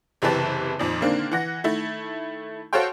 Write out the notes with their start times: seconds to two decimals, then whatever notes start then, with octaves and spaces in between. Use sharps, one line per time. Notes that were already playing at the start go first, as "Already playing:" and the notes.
0.22 F#1 C3 E3 G4 B4 A5
0.79 F2 A#2 D#3 F3
1.01 D3 D#3 A#3 C4 D4
1.31 E3 F#5 A#6
1.64 D#3 A3 E4
2.73 F#4 A4 C5 C#5 F5 G5